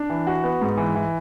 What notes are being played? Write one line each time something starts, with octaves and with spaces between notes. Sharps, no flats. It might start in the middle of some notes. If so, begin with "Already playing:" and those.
Already playing: D4
E3
F#4
B3
G#2
E3
E3